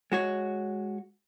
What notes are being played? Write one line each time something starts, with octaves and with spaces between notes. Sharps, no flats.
G#3 F#4 C#5